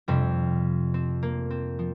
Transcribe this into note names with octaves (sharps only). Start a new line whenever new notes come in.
F2 C3 G3 C4
C4
A#3
C4
F3